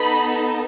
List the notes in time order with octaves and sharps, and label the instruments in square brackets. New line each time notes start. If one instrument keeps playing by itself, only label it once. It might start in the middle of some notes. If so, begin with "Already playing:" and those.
Already playing: [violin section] B3 D#4 A4 B5